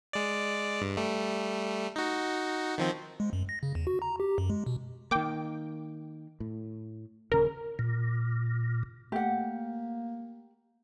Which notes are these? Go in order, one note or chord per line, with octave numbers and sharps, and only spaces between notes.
G#3 D5
G2
G3 A3
D#4 F#4
D#3 F3 C4
G#3
F#2
A#6
C#3
E2
F#4
A#5
G4
F#2
G#3
B2
D#3 A#3 G5 D6
A2
D#1 C#3 A#4
A#2
A3 A#3 G4 F#5